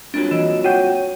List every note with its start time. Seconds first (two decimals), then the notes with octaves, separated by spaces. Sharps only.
0.14 C2 A#2 F#3 D4
0.31 E3 D#5 E7
0.64 F#4 C#5 G5 D#7